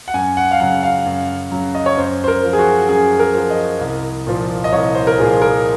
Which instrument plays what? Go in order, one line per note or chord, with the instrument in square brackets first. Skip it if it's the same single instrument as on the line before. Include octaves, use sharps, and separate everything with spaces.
[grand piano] F#5
F#2 G#5
F#5
F5
C#3 F#3 F#5
F5
F#2
C#3 F#3
D#5
C#5
F#2 C5
C5
A#4
F3
G#4
F#4
F#2 G#4
A#4
F3
D#5
C2
A#2 F3
D#5
C2 C#5
C5
A#4
A#2 F3 G#4
A#4